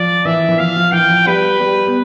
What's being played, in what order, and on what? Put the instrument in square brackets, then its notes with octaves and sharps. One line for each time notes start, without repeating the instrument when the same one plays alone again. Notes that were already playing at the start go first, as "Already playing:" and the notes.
Already playing: [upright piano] F3 [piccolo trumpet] D5
[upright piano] E3 [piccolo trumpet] E5
[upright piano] E3
[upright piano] F3 [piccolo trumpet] F5
[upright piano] F3
[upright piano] E3 [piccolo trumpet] G5
[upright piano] F3
[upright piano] G3 [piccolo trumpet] B4
[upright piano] G3
B3